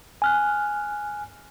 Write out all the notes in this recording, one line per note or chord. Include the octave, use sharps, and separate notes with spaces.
G#5 F6 F#6